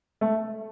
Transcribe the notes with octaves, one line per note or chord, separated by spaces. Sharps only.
A3